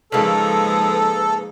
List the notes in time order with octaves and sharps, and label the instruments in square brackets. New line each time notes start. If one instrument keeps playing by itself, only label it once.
[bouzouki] C#3 A#3 [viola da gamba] F3 G#3 D#4 [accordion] A4 [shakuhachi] B4